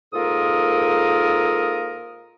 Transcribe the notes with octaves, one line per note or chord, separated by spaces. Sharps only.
G#2 A#3 F4 A4 A#4 D#6